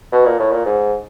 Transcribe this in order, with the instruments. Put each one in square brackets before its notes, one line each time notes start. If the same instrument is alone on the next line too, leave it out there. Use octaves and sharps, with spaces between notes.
[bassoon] B2
A#2
A2
A#2
G#2